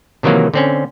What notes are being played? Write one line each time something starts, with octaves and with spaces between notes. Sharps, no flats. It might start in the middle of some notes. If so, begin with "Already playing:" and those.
C3 D#3 E3 F#3 A#3
D3 C4 C#4